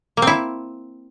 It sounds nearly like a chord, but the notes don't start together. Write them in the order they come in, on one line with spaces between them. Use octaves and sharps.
A#3 C4 E4